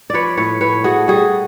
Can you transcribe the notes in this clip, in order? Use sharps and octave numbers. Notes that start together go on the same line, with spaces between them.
F3 B4 C#5 D5
A2 B4 C#5
A2 B4 C#5
A3 F#4 G#4
G3 F#4 G#4